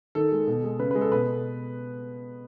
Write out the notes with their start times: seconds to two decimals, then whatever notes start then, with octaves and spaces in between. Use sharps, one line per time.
0.15 D#3 A4
0.32 G#3
0.47 B2
0.64 G#3
0.79 C#3 B4
0.91 G#3 B4
1.01 A4
1.12 B2 B4